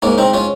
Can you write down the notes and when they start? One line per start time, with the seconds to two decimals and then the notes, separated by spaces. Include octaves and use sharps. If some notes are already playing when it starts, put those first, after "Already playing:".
0.02 G#2 A#3 C#4
0.18 C4 D#4
0.33 C#4 F4